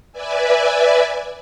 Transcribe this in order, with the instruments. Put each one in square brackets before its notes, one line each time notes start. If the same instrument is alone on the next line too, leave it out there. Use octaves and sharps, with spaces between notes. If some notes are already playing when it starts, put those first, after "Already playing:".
[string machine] B4 D5 E5 G#5